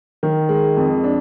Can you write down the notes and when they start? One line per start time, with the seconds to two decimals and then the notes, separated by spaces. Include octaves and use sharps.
0.23 D#3
0.49 G#3
0.77 F2
1.04 D4